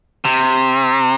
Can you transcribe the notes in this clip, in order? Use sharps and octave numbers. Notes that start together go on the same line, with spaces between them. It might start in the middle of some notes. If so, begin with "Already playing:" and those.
C3